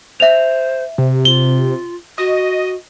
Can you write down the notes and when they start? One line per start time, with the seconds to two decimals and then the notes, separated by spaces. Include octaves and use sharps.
0.20 C5 E5 F7
0.98 C3
1.25 F4 G7
2.18 F#4 D#5